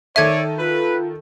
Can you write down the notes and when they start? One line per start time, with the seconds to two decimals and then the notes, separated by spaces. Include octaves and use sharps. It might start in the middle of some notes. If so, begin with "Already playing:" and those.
0.16 D#3 A4 C#5 D5 E5 G#6 D#7
0.59 F4 B4